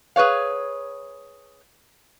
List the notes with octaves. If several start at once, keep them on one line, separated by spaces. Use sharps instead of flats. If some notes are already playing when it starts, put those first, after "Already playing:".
G#4 B4 C#5 F5